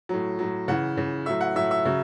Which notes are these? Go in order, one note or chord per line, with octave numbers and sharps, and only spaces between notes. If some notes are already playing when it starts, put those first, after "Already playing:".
A2 F#3
A2 F#3
C#3 E3 F#5
C#3 E3
A2 F#3 E5
F#5
A2 F#3 E5
E5
C#3 F#3